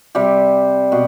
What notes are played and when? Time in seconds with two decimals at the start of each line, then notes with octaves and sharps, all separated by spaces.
0.15 C3 G3 G4
0.92 B2